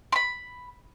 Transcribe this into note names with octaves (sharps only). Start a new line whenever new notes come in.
B5 C6